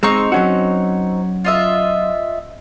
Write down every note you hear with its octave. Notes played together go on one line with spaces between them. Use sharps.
G#3 C4 D#4 C#6
F#3 C#4 F#4
F4 D#5 E5